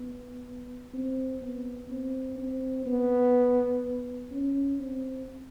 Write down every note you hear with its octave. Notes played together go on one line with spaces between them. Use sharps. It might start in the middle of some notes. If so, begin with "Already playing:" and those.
Already playing: B3
C4
B3
C4
C4
B3
C#4
C4